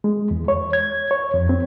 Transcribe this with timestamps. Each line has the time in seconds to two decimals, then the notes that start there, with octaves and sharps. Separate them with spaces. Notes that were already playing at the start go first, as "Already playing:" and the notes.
0.04 G#3
0.31 E2
0.48 C#5
0.73 G#6
1.11 C#5
1.34 F2
1.49 C4